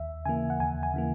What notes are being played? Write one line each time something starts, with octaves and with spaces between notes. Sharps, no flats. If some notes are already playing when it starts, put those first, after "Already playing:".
Already playing: D#2 E5
C#3 E3 A#3 G#5
F#5
D#2 G#5
G#5
C#3 E3 A#3